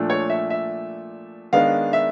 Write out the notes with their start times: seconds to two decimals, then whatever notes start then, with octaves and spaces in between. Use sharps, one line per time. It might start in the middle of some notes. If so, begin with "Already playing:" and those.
Already playing: A#2 F3 A3 D4
0.10 C#5
0.30 E5
0.50 E5
1.53 D#3 G#3 B3 D4 F5
1.93 E5